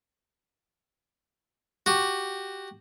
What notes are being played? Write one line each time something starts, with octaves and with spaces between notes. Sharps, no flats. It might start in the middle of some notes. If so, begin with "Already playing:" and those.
F#4 G4